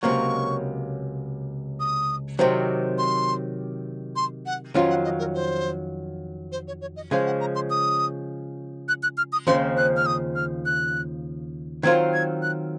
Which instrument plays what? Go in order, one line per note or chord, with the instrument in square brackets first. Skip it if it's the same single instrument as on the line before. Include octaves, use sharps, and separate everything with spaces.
[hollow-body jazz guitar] C#2 C3 F#3 A#3 [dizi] C#6
[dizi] D#6
[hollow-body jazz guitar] C3 D#3 F#3 C4
[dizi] C6
C6
F#5
[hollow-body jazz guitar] F2 D#3 F#3 C#4 F4 [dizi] F5
[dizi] F#5
D#5
A#4
C5
C5
C#5
C#5
D#5
[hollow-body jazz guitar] C#3 F3 G#3 C#4 [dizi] F5
[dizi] F#5
A#5
C6
D#6
F#6
F#6
F6
D#6
[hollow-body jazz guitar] D#2 C#3 F3 C4 [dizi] C6
[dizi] F#6
F6
D#6
F6
F#6
[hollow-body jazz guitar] D#3 F#3 C4 F4 A#4 [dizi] G#6
[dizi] G#6
F#6